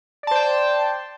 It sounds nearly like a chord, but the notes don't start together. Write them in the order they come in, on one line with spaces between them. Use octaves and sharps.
D5 A5 C5 G5